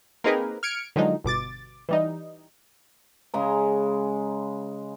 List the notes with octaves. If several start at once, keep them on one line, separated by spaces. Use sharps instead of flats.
A#3 C4 D#4 G#4 A#4 B4
F6 G#6 C#7 D7
D3 D#3 F3 F#3 G#3 D#4
G1 B2 D6 A6
E3 G3 D#4
C#3 G#3 G#5 A#5